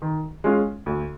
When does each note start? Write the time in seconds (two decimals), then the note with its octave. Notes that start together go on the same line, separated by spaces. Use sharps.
0.02 D#3
0.44 G#3 C#4 F4
0.86 D2